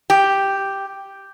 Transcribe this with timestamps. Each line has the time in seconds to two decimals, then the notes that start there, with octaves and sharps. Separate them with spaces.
0.10 G4